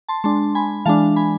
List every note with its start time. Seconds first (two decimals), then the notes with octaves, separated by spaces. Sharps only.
0.09 A5 C6
0.24 G#3 D4 A5 C6
0.55 G#5 B5
0.85 E3 G#3 D4 F5 A5
1.16 G#5 B5